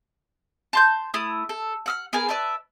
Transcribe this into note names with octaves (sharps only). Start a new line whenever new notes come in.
A5 C6 G6
A3 E4 D#6
A4
F#5 E6 F6
B3 G#4 A#4 G#5
B4 D5 E5 A5